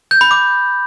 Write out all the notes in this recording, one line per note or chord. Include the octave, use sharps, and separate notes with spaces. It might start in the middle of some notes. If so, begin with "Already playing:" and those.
G6
B5
D6